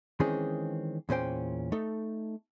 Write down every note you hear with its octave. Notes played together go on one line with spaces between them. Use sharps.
D#3 E3 G#3 C4 C#4 G#4
E2 A#2 C#4 C5 G5
A3 D#4 A4